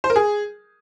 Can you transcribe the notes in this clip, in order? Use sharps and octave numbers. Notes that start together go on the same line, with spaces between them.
C5
A#4
G#4